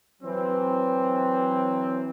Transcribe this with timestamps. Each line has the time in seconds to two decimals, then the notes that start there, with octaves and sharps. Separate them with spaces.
0.23 E3 F#3 C4